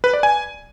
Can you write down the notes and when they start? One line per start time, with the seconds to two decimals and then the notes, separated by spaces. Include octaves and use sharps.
0.04 B4
0.13 D5
0.23 G#5